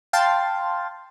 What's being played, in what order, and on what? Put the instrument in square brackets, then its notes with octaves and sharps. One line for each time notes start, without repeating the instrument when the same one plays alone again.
[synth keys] F5 G5 A5 C6 A6